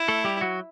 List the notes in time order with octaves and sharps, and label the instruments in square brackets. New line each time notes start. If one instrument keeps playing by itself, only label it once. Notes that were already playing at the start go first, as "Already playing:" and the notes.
Already playing: [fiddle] E4
[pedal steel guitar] A3 A4
G3 G4
F#3 F#4